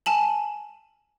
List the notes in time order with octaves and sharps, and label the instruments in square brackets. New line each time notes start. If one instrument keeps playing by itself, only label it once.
[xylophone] G#5 A5 F#7